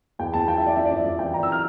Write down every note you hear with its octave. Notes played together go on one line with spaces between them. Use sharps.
E2 G5
E2 A5
F3 G5
E5
E2 D5
F2 E5
D5
F2
F2 D5
E3 G5
E2 A#5
E6
F6